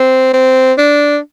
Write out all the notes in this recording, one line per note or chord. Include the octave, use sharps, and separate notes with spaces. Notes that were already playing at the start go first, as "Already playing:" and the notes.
Already playing: C4
C4
D4